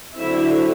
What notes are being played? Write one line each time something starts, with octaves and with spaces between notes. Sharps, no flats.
D3 F#3 C4 E4 E5